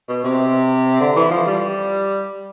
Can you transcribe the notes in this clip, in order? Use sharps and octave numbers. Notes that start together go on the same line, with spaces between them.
B2
C3
D3
E3
F3
G3